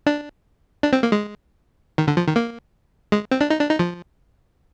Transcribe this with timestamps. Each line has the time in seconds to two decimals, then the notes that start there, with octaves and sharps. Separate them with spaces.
0.06 D4
0.83 D4
0.93 C4
1.03 A#3
1.12 G#3
1.98 D#3
2.08 D3
2.17 F3
2.27 D#3
2.36 A#3
3.12 G#3
3.31 C4
3.41 D4
3.50 D#4
3.60 D4
3.70 D#4
3.79 F3